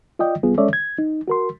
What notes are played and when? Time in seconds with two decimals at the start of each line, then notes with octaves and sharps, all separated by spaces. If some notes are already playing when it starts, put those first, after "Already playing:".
0.19 F4 D5 D#5 G5
0.43 C2 G3 B3 F4 G#4
0.58 G#3 C#4 A4 C#5 D5 E5
0.73 G#6
0.98 D#4
1.28 F#4 A#4 C6